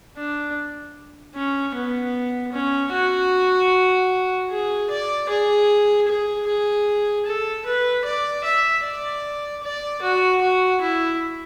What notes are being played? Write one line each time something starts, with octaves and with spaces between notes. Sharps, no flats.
D4
C#4
B3
C#4
F#4
G#4
D5
G#4
G#4
G#4
A4
B4
D5
E5
D5
D5
F#4
F#4
E4